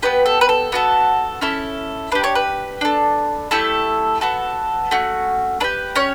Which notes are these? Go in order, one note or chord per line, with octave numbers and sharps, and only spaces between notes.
B3 D4 G4 B4
A4
B4
A4
B3 F#4 A4
C#4 E4 A4
D4 G4 B4
C#5
B4
D4 A4
A3 E4 G4 A4
B3 F#4 A4
A3 C#4 F#4
D4 G4 B4
C#4 C#5